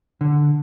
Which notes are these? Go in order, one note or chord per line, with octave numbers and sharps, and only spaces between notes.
D3